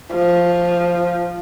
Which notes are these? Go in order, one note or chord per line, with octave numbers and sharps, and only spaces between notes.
F3